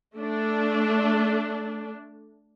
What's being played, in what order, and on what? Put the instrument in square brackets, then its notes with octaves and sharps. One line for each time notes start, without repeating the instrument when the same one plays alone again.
[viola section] A3 D4